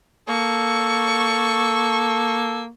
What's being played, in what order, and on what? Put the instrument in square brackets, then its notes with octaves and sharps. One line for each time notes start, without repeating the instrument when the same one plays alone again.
[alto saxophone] A#3 [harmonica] A4 [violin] C#6